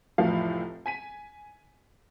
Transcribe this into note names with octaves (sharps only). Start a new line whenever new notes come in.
F1 C2 A2 E3 F3 F5
G#5 B6 D#7